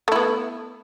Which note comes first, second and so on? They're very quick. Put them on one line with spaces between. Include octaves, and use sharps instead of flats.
A3 E4 B3